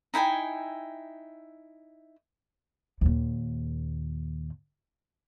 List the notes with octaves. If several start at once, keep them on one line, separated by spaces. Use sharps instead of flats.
D#4 E4 G5 G#5
D#2 A#2